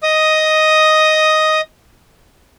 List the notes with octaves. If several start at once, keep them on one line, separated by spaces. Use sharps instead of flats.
D#5 D#6